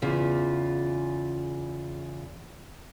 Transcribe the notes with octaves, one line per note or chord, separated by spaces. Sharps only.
E2 C#3 F4